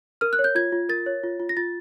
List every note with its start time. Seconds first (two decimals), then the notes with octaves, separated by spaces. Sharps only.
0.21 A#4 F6
0.33 F#6
0.39 C#5
0.44 G6
0.55 F4 G#6
0.72 F4
0.89 A#4 A6
1.06 C#5
1.24 F4
1.40 F4
1.49 A#6
1.57 F4 A6